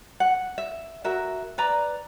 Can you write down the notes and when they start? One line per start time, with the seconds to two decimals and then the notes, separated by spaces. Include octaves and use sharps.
0.20 F#5
0.58 E5
1.04 F#4 A#4 E5
1.58 B4 D5 A#5